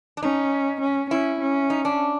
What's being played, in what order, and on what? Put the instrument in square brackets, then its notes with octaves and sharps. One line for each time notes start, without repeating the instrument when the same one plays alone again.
[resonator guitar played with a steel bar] D4
[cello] C#4 [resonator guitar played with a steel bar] D#4
[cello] C#4
[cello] C#4 [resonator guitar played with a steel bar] E4
[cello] C#4
[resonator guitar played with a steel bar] D#4
D4